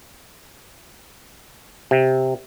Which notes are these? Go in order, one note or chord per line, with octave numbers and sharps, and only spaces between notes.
C3